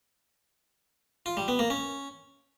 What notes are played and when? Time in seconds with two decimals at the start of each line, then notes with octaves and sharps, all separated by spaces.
1.26 F4
1.37 G3
1.48 B3
1.59 A#3
1.70 C#4